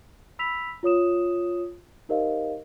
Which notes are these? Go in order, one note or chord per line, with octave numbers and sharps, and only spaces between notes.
B5 E6 B6 F7
F4 C#5 D#6 E7
D#4 G4 A#4 C5 D#5 F5